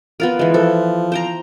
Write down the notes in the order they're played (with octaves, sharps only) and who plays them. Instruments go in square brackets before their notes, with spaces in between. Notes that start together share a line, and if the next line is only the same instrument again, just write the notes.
[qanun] B3 F4 A#4
E3 G#3
[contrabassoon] F3 [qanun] A4
[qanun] C5 G5 A#5